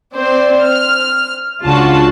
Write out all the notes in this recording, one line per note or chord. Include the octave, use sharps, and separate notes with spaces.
C4 C5 D5
F6
C#2 C#3 D4 F4 F#4 A5